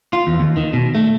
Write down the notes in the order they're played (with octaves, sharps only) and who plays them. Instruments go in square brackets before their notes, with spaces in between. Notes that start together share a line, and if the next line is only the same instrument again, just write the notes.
[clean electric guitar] F4
E2
D#2
D#3
B2
A3